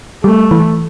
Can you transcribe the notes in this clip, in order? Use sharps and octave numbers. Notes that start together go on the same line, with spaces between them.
G3 A3
E3